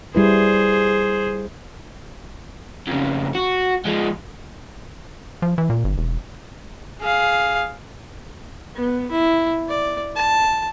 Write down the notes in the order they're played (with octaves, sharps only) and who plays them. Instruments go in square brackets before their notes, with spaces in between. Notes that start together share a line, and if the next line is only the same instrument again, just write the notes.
[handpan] G3 E4 B4 [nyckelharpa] G#4 C5
[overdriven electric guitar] F2 C#3
F#4
F3 G#3
[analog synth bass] F3
E3
A#2
G1
E1
[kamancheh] G#4 F5
[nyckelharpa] B3
E4
D5
A5